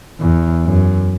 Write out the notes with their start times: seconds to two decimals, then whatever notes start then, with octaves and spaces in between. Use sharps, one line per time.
0.20 E2
0.65 F#2